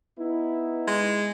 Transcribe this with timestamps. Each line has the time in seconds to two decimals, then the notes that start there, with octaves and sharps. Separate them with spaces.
0.17 B3 D#4 E4
0.87 G#3